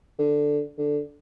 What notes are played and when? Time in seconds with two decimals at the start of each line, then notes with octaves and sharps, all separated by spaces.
0.19 D3
0.78 D3